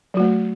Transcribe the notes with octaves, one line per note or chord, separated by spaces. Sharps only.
F#3 A3 F#4